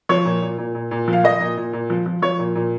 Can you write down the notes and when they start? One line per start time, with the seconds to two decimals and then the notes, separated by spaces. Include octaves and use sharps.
0.09 F3 C#5
0.25 A#2
0.42 A#2
0.58 A#2
0.75 A#2
0.91 A#2
1.08 F3 F5
1.24 F3 D#5
1.41 A#2
1.57 A#2
1.73 A#2
1.90 F3
2.06 F3
2.22 F3 C#5
2.39 A#2
2.55 A#2